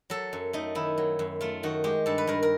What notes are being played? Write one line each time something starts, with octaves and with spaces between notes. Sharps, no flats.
F#3 A4
F#2
A3 D#4
D#3 E4
F#3
F#2
A3 F4
D#3 F#4
G#3 G4
G2 A4
B4
G2 A#4
A#4